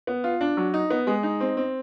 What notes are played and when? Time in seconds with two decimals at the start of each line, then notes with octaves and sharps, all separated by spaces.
0.07 B3
0.24 F4
0.41 D4
0.57 F#3
0.74 D#4
0.90 B3
1.07 G#3
1.23 D#4
1.40 C4
1.57 C4